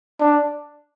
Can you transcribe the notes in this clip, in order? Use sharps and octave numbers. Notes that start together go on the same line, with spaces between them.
D4